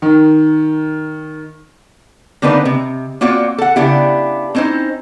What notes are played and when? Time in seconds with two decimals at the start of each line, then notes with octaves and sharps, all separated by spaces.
0.02 D#3
2.42 D3 A#3 C4 D4 D#4 B4
2.65 C3
3.21 A#3 C4 F4 F#4 C#5 D5
3.58 A4 F#5
3.76 C#3 B3 D4 E4 G4
4.55 C4 C#4 D#4 E4 C5